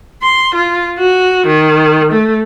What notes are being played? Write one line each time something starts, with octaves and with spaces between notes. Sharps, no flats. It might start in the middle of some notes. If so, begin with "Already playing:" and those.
C6
F4
F#4
D#3
A3